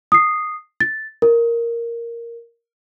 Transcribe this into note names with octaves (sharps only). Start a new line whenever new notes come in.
D#6 C7
A6
A#4